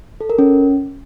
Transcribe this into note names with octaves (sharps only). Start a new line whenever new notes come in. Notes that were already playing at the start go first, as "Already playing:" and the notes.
A4
A#4
C#4